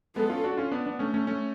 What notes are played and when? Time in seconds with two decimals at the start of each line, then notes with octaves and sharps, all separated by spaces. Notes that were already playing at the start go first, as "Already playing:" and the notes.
0.15 G#3 B3 A4
0.30 C#4 F4
0.44 D4 F#4
0.57 C#4 F4
0.71 B3 D4
0.86 B3 D4
0.99 A3 C#4
1.14 A3 C#4
1.27 A3 C#4